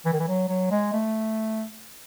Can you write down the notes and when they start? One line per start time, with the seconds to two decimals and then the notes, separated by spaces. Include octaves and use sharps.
0.06 E3
0.13 D#3
0.19 E3
0.28 F#3
0.49 F#3
0.71 G#3
0.93 A3